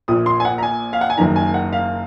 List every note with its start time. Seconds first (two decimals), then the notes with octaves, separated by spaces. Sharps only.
0.08 A#1 A#2 D#6
0.26 C6
0.40 G#5
0.45 F#5
0.58 A#5
0.63 G#5
0.93 F5
1.01 F#5
1.10 G#5
1.18 F#1 F#2 D#3 A#5
1.36 G#5
1.54 F#5
1.73 F5